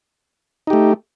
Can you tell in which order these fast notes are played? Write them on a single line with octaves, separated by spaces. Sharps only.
D#4 G4 A3